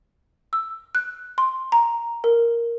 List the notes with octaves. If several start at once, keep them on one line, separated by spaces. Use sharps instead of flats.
E6
F#6
C6
A#5
A#4